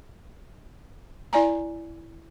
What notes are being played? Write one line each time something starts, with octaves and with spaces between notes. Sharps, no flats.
E4 D5 G#5 A#5